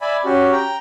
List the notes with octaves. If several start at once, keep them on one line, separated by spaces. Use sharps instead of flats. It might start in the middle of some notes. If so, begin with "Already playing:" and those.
D5 E5 G#5 B5
C#4 F#4 G4
G5 A#5